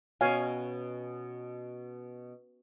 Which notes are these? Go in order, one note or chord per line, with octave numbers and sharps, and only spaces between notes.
B2 C#4 C#5 F5 G#5